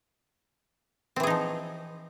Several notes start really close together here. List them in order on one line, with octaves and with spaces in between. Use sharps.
C4 E3 G#4 D#4 F3